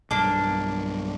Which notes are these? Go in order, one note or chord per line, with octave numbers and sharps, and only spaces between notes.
B1 G2 A#3 D4